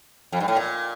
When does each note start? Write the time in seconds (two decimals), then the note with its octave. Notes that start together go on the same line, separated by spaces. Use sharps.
0.32 F2
0.40 G2
0.48 A2
0.56 A#2